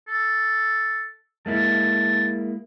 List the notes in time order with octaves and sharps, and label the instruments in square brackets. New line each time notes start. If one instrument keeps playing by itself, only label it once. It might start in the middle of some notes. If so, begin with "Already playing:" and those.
[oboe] A4
[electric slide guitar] G#3 A#3 E4 [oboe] A5